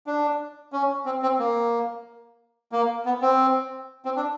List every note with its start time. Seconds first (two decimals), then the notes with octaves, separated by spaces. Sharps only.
0.07 D4
0.72 C#4
1.05 C4
1.22 C4
1.39 A#3
2.72 A#3
3.05 B3
3.22 C4
4.05 C4
4.16 D4